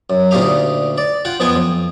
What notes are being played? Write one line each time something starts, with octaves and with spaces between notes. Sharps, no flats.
F#2
D2 A#2 D#4 G4 D#5 F5
D5
F4 F#5 G5
F2 B3 F4 D#5 G5 G#5
F2